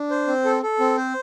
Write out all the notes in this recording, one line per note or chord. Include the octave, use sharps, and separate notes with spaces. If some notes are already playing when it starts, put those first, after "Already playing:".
Already playing: D4
C5
C4
A4
A4
C4
C5